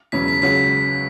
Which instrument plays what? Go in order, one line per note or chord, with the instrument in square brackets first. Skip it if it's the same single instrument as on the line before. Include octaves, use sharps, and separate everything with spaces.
[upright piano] E1 E2 C#3 F#3 C#4 [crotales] B6
[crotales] B6
[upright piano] C#2 C#3 F#3 C#4 F#4 [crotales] B6